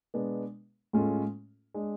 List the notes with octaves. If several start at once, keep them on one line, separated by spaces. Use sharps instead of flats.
B2 G#3 B3 D4
A2 G#3 C#4 F4 A4
G#3 D4